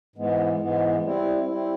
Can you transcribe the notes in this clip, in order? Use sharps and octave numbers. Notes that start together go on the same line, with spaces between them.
G#2 E3 G#3 B3
G#2 E3 G#3 B3
G3 C4 E4
G3 C4 E4